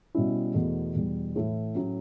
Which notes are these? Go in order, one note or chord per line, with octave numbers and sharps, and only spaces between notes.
B2 G3 C#4 E4
E2 B2 A3
E2 B2 G3
A2 E3 A3 E4
A2 F#3 C#4